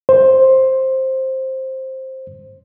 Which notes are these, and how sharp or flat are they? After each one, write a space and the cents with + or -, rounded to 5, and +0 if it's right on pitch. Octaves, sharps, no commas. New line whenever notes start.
C5 +10